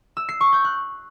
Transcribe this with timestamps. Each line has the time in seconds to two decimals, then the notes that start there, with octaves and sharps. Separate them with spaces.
0.17 E6
0.29 C7
0.41 C#6
0.53 G6
0.64 F#6